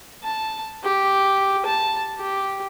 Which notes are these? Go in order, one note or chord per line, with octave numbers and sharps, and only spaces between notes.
A5
G4
A5
G4